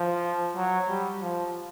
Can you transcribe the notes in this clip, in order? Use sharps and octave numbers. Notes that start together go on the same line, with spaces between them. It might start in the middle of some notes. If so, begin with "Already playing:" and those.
Already playing: F3
F#3
G3
F3